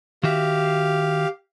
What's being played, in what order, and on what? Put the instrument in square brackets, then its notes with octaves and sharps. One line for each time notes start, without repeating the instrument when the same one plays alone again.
[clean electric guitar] D#3 F#4 E5 [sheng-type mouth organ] G4 F5